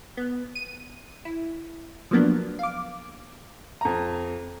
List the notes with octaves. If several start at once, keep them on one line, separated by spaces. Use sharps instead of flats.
B3
D#7
E4
F3 F#3 A#3 B3 D4
F5 D6
F2 A#5